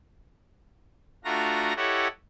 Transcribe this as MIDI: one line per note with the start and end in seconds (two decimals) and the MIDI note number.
1.24 1.73 57
1.24 1.73 62
1.24 1.73 65
1.24 1.73 66
1.24 1.73 82
1.24 1.73 94
1.77 2.08 64
1.77 2.08 67
1.77 2.08 69
1.77 2.08 73
1.77 2.08 75
1.77 2.08 78